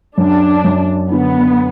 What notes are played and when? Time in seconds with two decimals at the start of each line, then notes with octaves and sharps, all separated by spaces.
0.18 F#2 D4
0.64 F#2
1.12 D3 B3